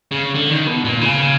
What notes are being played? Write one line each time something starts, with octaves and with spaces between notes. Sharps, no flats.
C#3
D3
D#3
B2
A#2
C#3